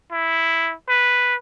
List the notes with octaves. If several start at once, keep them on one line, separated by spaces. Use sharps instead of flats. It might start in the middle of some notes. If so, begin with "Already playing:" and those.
E4
B4